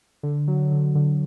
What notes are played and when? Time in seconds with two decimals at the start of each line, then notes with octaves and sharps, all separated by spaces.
0.23 D3
0.48 F#3
0.71 D3
0.95 D3